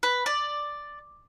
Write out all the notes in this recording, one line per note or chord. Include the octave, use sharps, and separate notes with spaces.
B4
D5